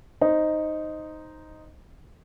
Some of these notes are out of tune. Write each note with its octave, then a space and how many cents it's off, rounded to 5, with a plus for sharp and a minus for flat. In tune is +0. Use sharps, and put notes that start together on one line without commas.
D#4 +0 C5 +0